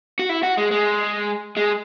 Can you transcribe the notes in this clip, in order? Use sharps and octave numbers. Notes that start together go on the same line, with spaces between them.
F#4
E4
F#4
G#3
G#3
G#3